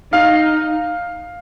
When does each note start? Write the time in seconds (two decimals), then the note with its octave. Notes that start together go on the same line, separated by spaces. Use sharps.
0.12 D#4 F5